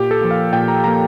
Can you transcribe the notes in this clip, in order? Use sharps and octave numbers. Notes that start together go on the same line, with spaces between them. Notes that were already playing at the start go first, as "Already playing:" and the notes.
Already playing: A#2 G4
A4
F3 A#3
F5
A#2 G5
A#5
F3 A#3 A#5